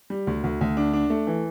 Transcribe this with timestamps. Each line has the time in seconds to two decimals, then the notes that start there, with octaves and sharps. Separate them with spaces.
0.10 G3
0.27 D2
0.44 D2
0.61 D2
0.77 D4
0.93 D4
1.10 A3
1.27 E3